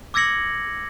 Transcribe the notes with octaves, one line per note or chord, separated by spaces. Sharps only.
D6 E6 G#6 A#6 C#7 F#7